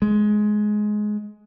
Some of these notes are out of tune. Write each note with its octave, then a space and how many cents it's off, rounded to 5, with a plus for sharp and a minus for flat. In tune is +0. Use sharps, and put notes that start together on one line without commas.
G#3 +15